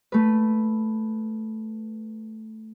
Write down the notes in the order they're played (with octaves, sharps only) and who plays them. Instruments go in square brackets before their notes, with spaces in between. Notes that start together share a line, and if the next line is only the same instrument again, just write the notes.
[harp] A3 B4